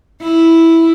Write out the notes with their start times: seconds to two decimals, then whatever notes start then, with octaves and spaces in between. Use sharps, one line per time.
0.23 E4